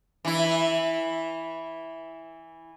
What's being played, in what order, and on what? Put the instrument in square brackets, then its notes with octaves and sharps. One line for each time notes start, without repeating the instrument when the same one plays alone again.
[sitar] E3 E4